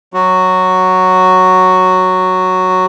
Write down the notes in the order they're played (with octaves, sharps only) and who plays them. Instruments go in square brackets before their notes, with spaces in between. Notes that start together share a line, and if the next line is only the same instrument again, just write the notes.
[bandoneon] F#3 F#4